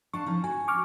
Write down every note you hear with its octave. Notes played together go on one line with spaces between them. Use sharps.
D4 F5 A5 C#6
F3 C#4 D#4
F#4 G#5
C#6 D6 F6